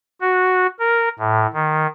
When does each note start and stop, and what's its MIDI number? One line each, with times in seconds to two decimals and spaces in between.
0.21 0.67 66
0.79 1.09 70
1.19 1.47 45
1.54 1.87 51